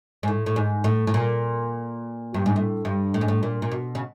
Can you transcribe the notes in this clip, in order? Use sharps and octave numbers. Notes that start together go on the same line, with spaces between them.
G#2
A2
A2
G#2
A2
A2
A#2
G2
G#2
A2
G2
A2
G#2
A2
A#2
A#2
B2
C#3